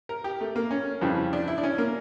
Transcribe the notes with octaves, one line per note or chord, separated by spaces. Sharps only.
A#4
G4
A3
A#3
C#4
F2 C#3 E3 G3
D4
E4
D4
C#4
A#3